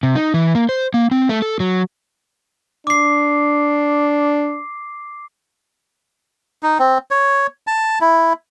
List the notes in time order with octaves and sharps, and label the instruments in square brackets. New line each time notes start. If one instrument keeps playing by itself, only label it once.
[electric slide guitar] C3
D#4
E3
A#3
C5
A#3
C4
A3
A4
F#3
[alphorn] D4 [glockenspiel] D6 C7
[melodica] D#4
C4
C#5
A5
E4